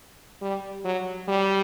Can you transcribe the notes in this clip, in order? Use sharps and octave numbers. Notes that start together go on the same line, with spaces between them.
G3
F#3
G3